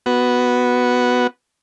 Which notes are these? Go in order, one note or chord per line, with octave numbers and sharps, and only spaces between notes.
B3 F#4